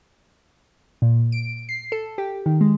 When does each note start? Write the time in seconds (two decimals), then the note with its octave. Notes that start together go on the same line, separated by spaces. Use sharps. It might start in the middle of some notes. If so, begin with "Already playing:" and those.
1.02 A#2
1.32 D7
1.69 C7
1.92 A4
2.18 G4
2.46 D#3
2.61 G#3